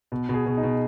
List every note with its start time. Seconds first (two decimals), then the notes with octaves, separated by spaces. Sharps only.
0.12 B2
0.29 B2 G#4
0.46 B2
0.57 D#4
0.63 B2